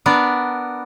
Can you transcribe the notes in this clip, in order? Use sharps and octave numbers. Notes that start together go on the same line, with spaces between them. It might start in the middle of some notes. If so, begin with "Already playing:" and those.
B3 D4 A#4 B4